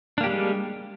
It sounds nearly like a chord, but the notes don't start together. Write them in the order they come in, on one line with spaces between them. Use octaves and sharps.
D4 A#3 G4 G3 G#3